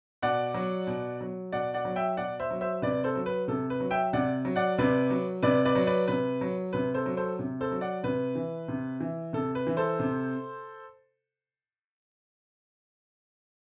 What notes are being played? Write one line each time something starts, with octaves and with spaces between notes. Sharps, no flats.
B2 D5 F#5
F#3
B2
F#3
B2 D5 F#5
D5 F#5
F#3
E5 G5
B2 D5 F#5
C5 E5
F#3
C5 E5
C3 B4 D5
A4 C5
F#3
B4
C3 A4
B4
F#3
E5 G5
C3 D5 F#5
F#3
D5 F#5
C3 B4 D5
F#3
C3 B4 D5
B4 D5
F#3
B4 D5
C3 B4
F#3
C3 B4
A4 C5
F#3
A4 C5
C3
A4 C5
F#3
D5 F#5
C3 B4
E3
C3
E3
C3 A4
B4
E3
A4 C5
C3